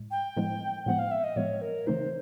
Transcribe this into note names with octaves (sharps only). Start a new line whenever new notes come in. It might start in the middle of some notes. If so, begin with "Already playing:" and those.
Already playing: A2 G#3
G5
A2 F3 G#3 B3
A2 F3 G#3 B3 F#5
F5
E5
D#5
A2 F3 G#3 B3 C#5
A#4
C#3 E3 A3 C4 D#4 C5